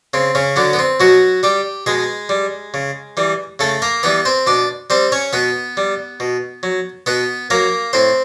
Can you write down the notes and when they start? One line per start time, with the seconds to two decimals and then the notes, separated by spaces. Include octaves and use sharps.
0.14 C#3 C4
0.35 C#3 C#4
0.56 D3 F#3 D4
0.73 B3
0.79 C4
1.00 B2 F#3 F#4
1.43 G3 G4
1.86 B2 G#3 G#4
2.29 G3
2.74 C#3
3.17 E3 G3
3.59 C#3 A3 A4
3.82 A#3 A#4
4.03 E3 G3 B3 B4
4.25 C4 C5
4.47 B2 D4 D5
4.90 G3 C4 C5
5.12 C#4 C#5
5.33 B2 B3 B4
5.77 G3
6.20 B2
6.63 F#3
7.06 B2 B3 B4
7.50 F#3 A#3 A#4
7.93 A2 C4 C5